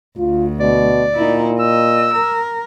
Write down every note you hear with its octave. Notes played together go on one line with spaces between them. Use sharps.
D2 F4
B2 D5
A#2 D#4 E4
D#5 E6
A#4